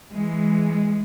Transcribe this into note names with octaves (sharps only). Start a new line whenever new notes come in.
E3 G#3